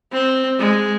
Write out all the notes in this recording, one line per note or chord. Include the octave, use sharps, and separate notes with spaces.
C4
G#3